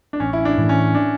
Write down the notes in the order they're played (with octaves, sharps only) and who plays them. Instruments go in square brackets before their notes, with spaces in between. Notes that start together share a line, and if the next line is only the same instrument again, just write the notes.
[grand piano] D4
[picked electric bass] A1 [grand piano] C#4
[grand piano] E4
D4
[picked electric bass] A2 E3 A3
[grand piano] C#4
D4